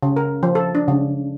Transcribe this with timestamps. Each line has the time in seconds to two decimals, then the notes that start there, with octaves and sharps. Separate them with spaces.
0.03 C#3
0.16 A#4
0.43 F3
0.55 A4
0.75 D4
0.88 C#3